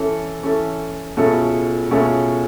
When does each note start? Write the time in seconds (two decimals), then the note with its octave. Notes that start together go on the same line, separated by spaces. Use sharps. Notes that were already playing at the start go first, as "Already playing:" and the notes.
Already playing: E3 C#4 A4
0.43 E3 C#4 A4
1.17 C#2 B2 A3 C#4 A4
1.91 C#2 B2 A3 C#4 A4